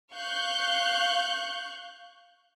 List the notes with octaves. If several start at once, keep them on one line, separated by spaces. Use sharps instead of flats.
F5 C#6 F#6 G6